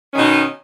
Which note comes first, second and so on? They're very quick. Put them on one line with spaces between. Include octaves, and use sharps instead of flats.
C#4 D#3 B2 D#4